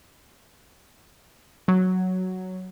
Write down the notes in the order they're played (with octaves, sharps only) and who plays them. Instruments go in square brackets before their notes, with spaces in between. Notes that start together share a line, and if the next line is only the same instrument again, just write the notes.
[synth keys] F#3